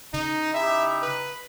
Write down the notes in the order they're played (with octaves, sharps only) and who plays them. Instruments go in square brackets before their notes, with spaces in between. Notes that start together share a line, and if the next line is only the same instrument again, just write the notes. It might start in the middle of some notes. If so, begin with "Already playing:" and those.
[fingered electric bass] C#3 [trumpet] D#4
[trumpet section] D#4 E4 G4 [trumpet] E5
[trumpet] B4